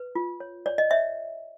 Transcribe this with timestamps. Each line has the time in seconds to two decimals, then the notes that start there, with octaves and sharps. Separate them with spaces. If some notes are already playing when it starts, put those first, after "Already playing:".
Already playing: B4
0.15 F4
0.40 C#5
0.66 C#5 D5
0.78 D#5
0.90 C#5 E5